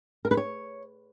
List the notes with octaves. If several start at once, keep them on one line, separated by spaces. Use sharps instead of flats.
A#4
B4
C#5